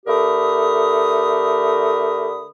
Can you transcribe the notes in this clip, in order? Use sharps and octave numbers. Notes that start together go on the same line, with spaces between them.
D3 A3 G4 A#4 B5 D#6